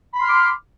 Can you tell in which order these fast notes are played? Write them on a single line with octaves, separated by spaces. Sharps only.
B5 C6 F6 D6